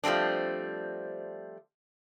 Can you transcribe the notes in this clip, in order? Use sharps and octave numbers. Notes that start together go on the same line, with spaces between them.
F3 G3 A3 C4 D4